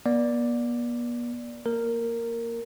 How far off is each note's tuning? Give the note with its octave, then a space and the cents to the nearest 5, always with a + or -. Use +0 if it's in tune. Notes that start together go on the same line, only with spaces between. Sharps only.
B3 -45 D5 +0
A#3 +0 A#4 -10